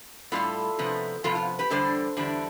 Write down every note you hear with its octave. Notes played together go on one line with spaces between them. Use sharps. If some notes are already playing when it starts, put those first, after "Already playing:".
A2 G3 B3 F4 A4
C3 F3 B3
C3 F3 B3 F4 A4
F4
G4 B4
E2 D3 G3 D4 A4 C5
E2 D3 G3 D4